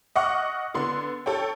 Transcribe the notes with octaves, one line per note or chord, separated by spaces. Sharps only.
D#5 F#5 C#6 D6 F6
D3 B3 C6
A4 C#5 G5